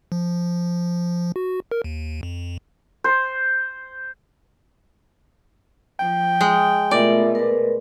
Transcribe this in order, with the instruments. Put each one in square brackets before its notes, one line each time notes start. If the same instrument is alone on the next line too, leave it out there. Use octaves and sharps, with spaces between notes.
[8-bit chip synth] F3
F#4
A#4
D#2
F2
[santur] C5
[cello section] F3 [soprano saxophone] G5
[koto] G#3
[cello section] B2 A3 [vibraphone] F4 A#4 E5 [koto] D5
[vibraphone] A#4 B4